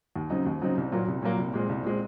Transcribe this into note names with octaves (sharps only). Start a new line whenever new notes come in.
D#2
C#3 F#3 C4 D#4
D#2
C#3 F#3 C4 D#4
C2
A#2 F#3 A#3
C2
A#2 F#3 A#3
C2
A#2 G#3 C4
C2
A#2 G#3 C4